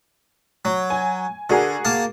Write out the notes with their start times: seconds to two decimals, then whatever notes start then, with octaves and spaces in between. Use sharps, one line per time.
0.65 F#3
0.90 G#5
1.50 D3 F#4 G#4 A#4
1.85 A#3 A5